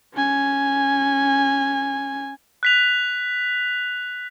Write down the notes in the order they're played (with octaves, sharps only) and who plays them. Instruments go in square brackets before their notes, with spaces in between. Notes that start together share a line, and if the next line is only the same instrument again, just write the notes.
[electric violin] C#4 G#5
[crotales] F#6 B6 F7